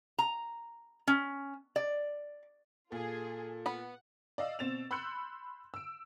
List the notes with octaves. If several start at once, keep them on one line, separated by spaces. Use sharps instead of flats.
A#5
C#4
D5
A#2 F4 G#4 A4
B3 F#5 B5
D5 D#5 F5 E6
B2 C4 A6 E7 F7
B5 C6 E6 F#6 G6 C#7
E6 D7